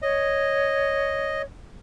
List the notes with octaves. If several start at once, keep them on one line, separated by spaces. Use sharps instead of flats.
C#5 D#5